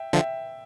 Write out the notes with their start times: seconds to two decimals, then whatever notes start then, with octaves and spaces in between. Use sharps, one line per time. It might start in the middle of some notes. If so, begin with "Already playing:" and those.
Already playing: E5 G5
0.13 D3 F3 E5 G5